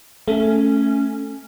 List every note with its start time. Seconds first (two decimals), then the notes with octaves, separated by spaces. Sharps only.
0.28 A3 C#4